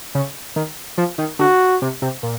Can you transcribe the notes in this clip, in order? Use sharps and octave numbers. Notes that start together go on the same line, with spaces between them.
C#3
D#3
F3
D#3
D3 F#4
C3
C3
A#2